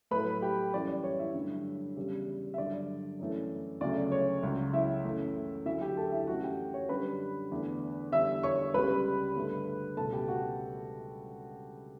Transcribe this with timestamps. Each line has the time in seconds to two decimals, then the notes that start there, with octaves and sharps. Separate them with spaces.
0.11 A2 F#3 A3 B4 B5
0.42 G4 G5
0.73 F#2 E3 G3 D5
0.88 D5
1.04 C#5
1.19 E4 E5
1.34 G2 D3 F#3 A3
1.96 E2 C#3 G3
2.54 E5
2.58 G2 D3 F#3 D5
3.19 F#2 E3 A3
3.81 D2 C#3 F#3 A3 D5
4.12 C#5
4.43 C#2 C#3 F#3
4.73 E4 E5
5.05 F#2 E3 A3
5.66 D2 D3 F#3 A3 E4 E5
5.81 G4 G5
5.97 A4 A5
6.12 E4 E5
6.27 F#2 E3 A3 F#4 F#5
6.43 G4 G5
6.74 C#5
6.89 F#2 D3 G3 B4 B5
7.52 E2 D3 A3
8.12 E2 D3 G3 E5 E6
8.43 C#5 C#6
8.74 C#2 C#3 G3 B4 B5
9.36 G2 D3 A3
9.97 C#2 B2 A3 A4 A5
10.12 G4 G5
10.28 F#4 F#5